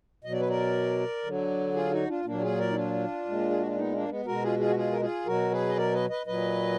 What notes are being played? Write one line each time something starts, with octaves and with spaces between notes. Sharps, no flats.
B2 F#3 D#5
D5
B4
A#4 D5
D3 F#3
F4 G#4
D#4 F#4
D4 F4
A#2 F#3 A#3 D4
F4 G#4
A#4 D5
D#4
D4 F4
A#2 G#3
G#4
F#4
F4
B3 D#4
A#3 D4
G#3 B3
B2 G#3 F#4 A#4
F4 G#4
F4 G#4
F#4
F4 G#4
A#4
F4 G#4
B2 F#3 F#4 A#4
G#4 B4
D#5
A#4 D5
B4 D#5
B4 D#5
A#2 F#3 B4 D#5